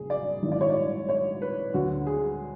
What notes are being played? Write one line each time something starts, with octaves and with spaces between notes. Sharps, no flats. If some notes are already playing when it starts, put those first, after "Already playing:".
Already playing: F#1 G#4
D5
G#1 G#2 E3
D5
C#5
D5
C#5
B4
D2 D3 F#4
G#4